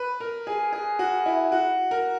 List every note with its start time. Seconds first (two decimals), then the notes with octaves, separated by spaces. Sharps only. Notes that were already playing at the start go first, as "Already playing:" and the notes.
Already playing: B4
0.20 A#4
0.47 G#4
0.73 G#4
0.99 F#4
1.26 E4
1.52 F#4
1.91 A#4